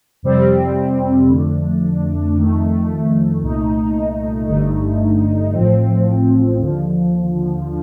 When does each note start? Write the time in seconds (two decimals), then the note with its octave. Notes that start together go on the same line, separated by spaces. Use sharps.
0.23 F2 C3 G3 C4
1.29 F2 D3 A3 D4
2.35 F2 D#3 A3
3.42 C2 A#2 A3 D#4
4.47 G1 G2 D3 A3 D#4
5.53 A1 A2 F3 C4
6.60 D#2 D3 F3